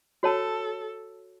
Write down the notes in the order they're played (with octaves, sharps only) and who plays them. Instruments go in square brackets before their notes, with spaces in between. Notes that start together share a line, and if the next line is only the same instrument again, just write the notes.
[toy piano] F#4 C#5 A5 [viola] A4